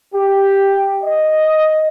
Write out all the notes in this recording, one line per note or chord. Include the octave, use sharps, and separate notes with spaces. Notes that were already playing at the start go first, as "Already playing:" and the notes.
G4
D#5